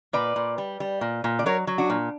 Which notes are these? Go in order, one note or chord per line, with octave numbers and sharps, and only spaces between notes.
A#2 B4 D5
A#2
G3
G3
A#2
A#2
D5
F#3 A#4 C#5
F#3
D4 F#4
A#2